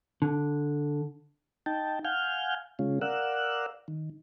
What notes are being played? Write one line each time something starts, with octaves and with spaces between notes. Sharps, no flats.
D3
D#4 G5 A5
F5 F#5 G#5 F6 G6
C#3 G#3 C#4 F4
A#4 D5 F5 F#5 E6 F#6
D#3